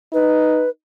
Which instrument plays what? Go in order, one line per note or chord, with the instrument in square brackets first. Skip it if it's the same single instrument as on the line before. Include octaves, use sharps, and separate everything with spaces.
[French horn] D#4 [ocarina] B4